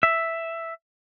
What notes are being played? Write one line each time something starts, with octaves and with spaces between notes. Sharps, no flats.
E5